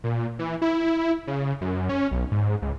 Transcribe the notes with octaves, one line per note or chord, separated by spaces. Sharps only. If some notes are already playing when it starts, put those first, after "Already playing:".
A#2
E3
E4
C#3
F#2
C#4
B1
G#2
C#2